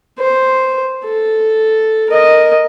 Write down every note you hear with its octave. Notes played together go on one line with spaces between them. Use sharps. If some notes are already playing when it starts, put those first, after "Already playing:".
C5
A4
A#4 D#5